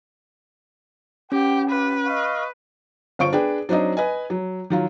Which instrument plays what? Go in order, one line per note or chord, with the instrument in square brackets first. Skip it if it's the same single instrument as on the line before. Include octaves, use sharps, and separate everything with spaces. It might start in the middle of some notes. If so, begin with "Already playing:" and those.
[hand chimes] C#4 [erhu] G4 [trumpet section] B4 F#5 G5
[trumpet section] F4 G4 [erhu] B4
[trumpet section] D#5 F5 C#6
[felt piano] G1 F4 C5 C#6 D7
D4 G#4 B4 G5
F#3 C4 D4 D#4 D#5
B4 D#5 G#5
F#3
D#3 F#3 F4